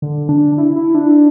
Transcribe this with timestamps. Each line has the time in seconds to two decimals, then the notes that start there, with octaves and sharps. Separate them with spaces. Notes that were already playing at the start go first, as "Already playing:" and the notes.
0.02 D3
0.29 D4
0.58 E4
0.76 E4
0.95 D4